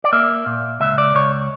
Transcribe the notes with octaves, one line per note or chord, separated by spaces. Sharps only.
D5
A#3 E5
A#2
C#2 E5
D5
C#2 C#5